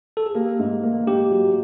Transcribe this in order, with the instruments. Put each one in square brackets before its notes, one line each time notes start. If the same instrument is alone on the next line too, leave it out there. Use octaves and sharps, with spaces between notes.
[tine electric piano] A4
G#4
[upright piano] A#3 [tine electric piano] G4
[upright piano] G#2
A#3
[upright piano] G#2 [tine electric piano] G4
[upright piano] F#3